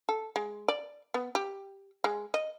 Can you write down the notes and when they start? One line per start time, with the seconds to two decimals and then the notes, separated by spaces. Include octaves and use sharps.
0.09 A4
0.36 G#3
0.68 D5
1.14 B3
1.35 G4
2.04 G#3
2.34 D#5